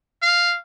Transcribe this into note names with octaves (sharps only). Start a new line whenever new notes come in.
F5